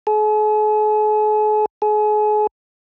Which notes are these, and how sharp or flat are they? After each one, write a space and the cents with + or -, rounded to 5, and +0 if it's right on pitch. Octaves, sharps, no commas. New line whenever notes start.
G#4 +45
G#4 +35